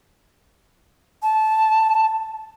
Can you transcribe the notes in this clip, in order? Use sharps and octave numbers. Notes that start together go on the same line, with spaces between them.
A5